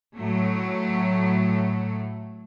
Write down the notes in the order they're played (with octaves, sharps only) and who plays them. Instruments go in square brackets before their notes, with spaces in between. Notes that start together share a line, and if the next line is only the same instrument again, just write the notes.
[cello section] A2 F#3 A3